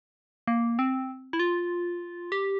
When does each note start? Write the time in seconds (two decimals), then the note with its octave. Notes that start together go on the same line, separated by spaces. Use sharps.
0.47 A#3
0.79 C4
1.33 E4
1.39 F4
2.32 G4